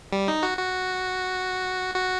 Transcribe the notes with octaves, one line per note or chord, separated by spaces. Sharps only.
G3
D#4
F#4
F#4
F#4